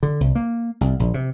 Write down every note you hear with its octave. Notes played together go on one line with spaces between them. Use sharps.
D3
C2
A#3
C2
A#1
C3